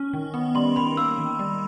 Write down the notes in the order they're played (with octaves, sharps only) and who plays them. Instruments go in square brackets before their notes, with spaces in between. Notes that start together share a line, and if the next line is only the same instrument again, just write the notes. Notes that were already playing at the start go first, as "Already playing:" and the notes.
Already playing: [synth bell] C#4
D#3
B3
[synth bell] G3 [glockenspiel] C6
[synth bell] D#3 [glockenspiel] B5
[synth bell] A#3 [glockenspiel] E6
[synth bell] D#3
G3